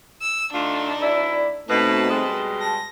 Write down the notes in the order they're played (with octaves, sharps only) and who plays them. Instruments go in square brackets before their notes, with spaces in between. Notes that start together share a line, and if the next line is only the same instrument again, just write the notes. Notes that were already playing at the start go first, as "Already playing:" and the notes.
[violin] E6
[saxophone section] D3 A3 F4 [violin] D4 D#4
[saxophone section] D2 E4 [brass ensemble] D5
[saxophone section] B2 [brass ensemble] A3 C4 D#4 [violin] B4 A5
[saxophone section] B2 G3 G#3
[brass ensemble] A5 [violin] A#6